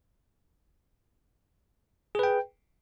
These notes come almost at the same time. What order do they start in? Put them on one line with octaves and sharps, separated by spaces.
G#4 B4 G5